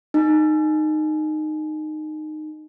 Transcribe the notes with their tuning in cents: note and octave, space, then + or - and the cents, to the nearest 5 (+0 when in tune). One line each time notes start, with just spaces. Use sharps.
D#4 -15